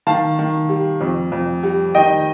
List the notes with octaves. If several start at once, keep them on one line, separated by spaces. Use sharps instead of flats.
D#3 F5 A5
D#3
G3
F2
F2
G3
D#3 D#5 G5